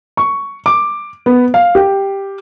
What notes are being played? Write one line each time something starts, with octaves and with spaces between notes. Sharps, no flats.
C#6
D6
B3
F5
G4